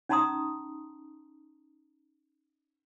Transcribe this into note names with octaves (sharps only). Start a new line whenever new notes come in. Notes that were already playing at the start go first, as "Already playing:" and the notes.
C#4 D#4 A5 A#5 C6 D#6